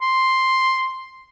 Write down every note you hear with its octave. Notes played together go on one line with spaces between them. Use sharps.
C6